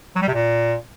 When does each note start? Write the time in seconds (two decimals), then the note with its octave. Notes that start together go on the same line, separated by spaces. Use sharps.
0.16 F#3
0.22 G3
0.28 C3
0.34 A#2